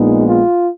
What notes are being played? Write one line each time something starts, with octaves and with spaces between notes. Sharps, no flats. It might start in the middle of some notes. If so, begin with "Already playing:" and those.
Already playing: A#1 A#2 G#3 B3 D#4
F4